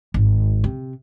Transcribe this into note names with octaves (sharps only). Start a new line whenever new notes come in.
G#1
C3